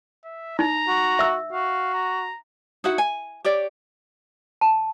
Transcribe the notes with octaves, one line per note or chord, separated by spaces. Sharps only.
E5
D#4 A#5
F#4
E5 E6
F#4 F5
A#5
D#4 E4 F#4 F#5
G#5
G4 C#5 D5
A5